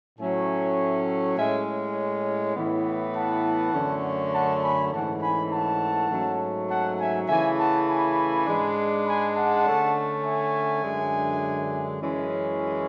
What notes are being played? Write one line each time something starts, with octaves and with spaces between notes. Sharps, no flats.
A2 F#3 A3 C#4 E5 G#5
A2 G#3 C#4 E5 G#5
A2 E3 B3
F#5 A5
F#2 D3 A3 C#4
F#5 A5
G#5 B5
G#2 E3 A3 C#4 F#5 A5
G#5 B5
F#5 A5
G#2 F#3 A3 C#4
F#5 A5
E5 G#5
C#3 E3 A3 E5 G#5
F#5 A5
G#5 B5
G#2 G#3 D4
G#5 B5
F#5 A5
D3 A3 C#4
E5 G#5
F#2 D3 G#3 D4
F#2 E3 G#3 C#4